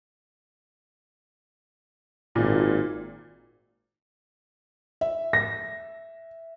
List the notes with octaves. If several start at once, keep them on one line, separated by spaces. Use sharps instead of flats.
G#1 A#2
E5
A#6